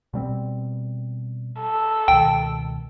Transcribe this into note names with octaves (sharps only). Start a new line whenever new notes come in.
B2 G3 C4
A4
C#2 B2 D#3 G5